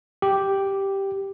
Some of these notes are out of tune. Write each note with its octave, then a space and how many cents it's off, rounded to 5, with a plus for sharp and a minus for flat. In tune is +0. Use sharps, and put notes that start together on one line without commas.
G4 +0